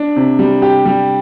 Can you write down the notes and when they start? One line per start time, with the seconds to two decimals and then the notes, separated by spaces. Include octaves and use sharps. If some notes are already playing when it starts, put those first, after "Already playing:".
Already playing: D4
0.16 C3
0.39 G3
0.62 G4
0.86 G3